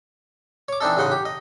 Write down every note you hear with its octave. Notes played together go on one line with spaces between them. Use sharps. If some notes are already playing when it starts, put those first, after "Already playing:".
C#5 D6
E3 C4 D4 D#4 A4
A1 C#3 D#4 F#5 C6
G4
D#5